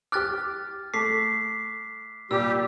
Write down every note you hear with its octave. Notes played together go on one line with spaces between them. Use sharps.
G4 D6 F6 F#6 A6
A3 D6 B6 C7
A#2 G3 G4 E6